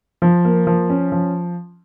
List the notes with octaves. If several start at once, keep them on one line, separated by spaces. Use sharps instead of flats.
F3
A#3
F3
C#4
F3